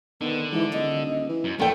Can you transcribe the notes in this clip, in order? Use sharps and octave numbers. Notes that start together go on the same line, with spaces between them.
D3 D#3 B3
G#2 E3
D#1 D#5
E3
F#2
A#1 E2 A3 A4 G5